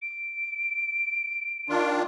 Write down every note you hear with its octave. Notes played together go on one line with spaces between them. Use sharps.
D7
D#3 D4 F4